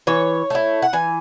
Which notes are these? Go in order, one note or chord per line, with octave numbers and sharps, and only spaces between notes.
E3 C#5
A3 E4
F#5
E3 G#5